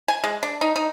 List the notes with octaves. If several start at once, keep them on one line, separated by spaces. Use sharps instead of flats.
G#5
G#3
D4
D#4
D#4